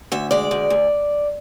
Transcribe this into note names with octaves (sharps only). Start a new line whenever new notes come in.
D2 E5
G#3 D5
D2
D2